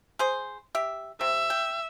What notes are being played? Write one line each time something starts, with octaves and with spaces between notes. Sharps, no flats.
G#4 C5
G4 E5
C3 E5
G5